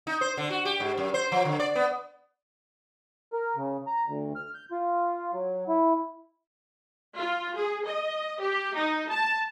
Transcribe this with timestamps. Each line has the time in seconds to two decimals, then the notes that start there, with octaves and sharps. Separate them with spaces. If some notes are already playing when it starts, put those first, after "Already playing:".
0.07 D#4
0.21 C5
0.37 D3
0.50 F#4
0.65 G4
0.80 G#2
0.97 F#2
1.14 C5
1.32 F3
1.45 D3
1.60 D5
1.75 B3
3.33 A#4
3.56 C#3
3.87 A#5
4.07 D2
4.36 F6
4.54 G6
4.72 F4
5.33 F#3
5.68 E4
7.17 F4
7.56 G#4
7.85 D#5
8.41 G4
8.75 D#4
9.10 A5